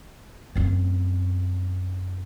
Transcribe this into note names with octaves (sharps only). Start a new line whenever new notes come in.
F#2 C4